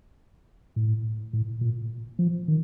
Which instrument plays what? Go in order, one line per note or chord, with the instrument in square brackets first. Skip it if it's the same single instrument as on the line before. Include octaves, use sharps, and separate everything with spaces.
[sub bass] A2
A2
A#2
F3
D#3